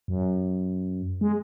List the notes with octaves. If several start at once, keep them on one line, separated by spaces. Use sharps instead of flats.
F#2
G#3